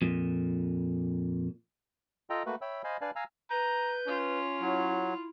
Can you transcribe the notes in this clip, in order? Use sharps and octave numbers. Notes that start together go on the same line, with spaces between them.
F2 A#2
F4 A4 D#5 G5 A#5
A3 A#3 F#4 B4
C#5 E5 G5 B5 E6
C5 D#5 F5 G#5 B5
D4 B4 D5 F5 G#5 A5
F5 G#5 A#5 E6
B4 A#5 G6
C#4 F4
F#3 E4